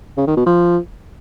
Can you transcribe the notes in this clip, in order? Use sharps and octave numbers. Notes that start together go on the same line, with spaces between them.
C#3
D#3
B2
F3